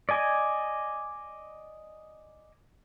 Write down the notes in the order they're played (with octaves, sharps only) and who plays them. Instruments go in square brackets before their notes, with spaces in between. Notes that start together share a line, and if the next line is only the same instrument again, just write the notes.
[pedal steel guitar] D5 D#5 G#5